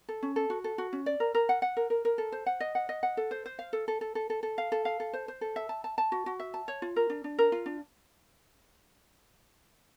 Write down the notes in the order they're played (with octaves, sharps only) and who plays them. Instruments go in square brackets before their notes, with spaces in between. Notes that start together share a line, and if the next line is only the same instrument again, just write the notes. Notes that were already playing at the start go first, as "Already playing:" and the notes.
[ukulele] A4
C#4
A4
F#4
A4
F#4
C#4
D5
A#4
A#4
F#5
F#5
A#4
A#4
A#4
A4
C5
F#5
D#5
F#5
D#5
F#5
A4
C5
C5
F5
A4
A4
A4
A4
A4
A4
F5
A4
F5
A4
C5
C5
A4
E5
A5
A5
A5
F#4
F#4
E5
A5
C#5
F4
A#4
D4
D4
A#4
F4
D4